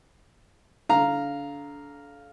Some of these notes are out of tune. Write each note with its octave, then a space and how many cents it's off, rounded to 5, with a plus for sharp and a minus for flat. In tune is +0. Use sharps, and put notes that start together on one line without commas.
D3 -30 F5 +0 A#5 +0